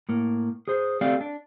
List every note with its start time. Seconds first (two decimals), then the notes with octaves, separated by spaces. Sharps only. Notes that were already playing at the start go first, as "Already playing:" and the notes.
0.09 A2 A#3
0.68 G#4 C5
1.01 A3 C4 G4 D5 F5
1.21 D4